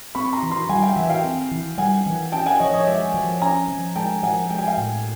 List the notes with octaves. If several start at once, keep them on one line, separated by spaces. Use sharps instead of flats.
C4 B5 C#6
A#5 C6
E3
A#5 C6
G3 F#5 G#5
F5 G5
E3 E5 F#5
F5 G5
C4
E3
G3 F#5 G#5
E3
C#4 G5 A5
F#5 G#5
F3 C#5 D#5
C#5 D#5
G#3 D5 E5
F3
C#4 G#5 A#5
F3
G#3 G5 A5
F3 F#5 G#5
G#3 G5
G#5
F5 G5
A2